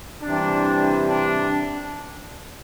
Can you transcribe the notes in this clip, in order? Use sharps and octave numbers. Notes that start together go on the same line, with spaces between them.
C3 E3 G3 D4
D4